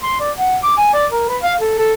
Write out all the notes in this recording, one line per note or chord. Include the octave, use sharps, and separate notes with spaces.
C6
D5
F#5
D6
G#5
D5
A#4
B4
F5
A4
A4